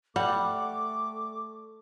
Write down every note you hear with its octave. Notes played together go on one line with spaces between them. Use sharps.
G3 A3 F#5 D6